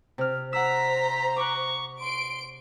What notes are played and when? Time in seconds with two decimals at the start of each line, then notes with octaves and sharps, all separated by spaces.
0.18 C3 F6
0.53 C5 F#5 A#5 E6 B6
1.37 C#6 D6 F#6
2.00 C6 D7